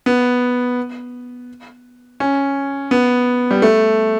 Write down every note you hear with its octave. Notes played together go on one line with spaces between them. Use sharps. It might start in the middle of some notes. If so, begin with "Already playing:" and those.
B3
C#4
B3
G3
A3